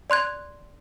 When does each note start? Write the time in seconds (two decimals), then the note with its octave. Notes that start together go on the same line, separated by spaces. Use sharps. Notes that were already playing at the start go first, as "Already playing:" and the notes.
0.10 D5 C6 F#6 G#6